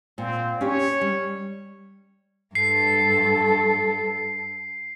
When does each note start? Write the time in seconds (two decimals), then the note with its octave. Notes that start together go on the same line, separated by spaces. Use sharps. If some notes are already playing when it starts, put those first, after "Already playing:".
0.18 A#2 C4
0.61 C#4 G4 C#5
1.01 G3
2.55 G2 A4 C7